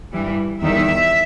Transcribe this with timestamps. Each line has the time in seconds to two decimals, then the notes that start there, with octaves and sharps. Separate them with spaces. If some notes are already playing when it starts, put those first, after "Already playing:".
0.12 G2 E3 G3
0.62 E2 D#3 G3 E5